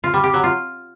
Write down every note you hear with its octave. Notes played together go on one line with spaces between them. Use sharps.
F4
G3
G4
F#3
F4